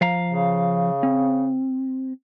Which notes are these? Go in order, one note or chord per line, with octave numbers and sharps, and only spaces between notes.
F3 F5 A#5
C#3
C4